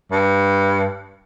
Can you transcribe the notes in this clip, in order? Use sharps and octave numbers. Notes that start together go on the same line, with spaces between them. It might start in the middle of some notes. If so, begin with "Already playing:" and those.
G2